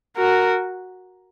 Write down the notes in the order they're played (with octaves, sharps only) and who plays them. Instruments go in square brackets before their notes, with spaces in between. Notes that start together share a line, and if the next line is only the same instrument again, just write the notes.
[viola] F#4 [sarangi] A#4